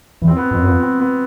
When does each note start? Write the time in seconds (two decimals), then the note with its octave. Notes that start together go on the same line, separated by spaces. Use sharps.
0.22 E2
0.28 C4
0.36 B3
0.51 F2 C4
0.60 F#2
0.65 F2 B3
0.80 C4
1.00 B3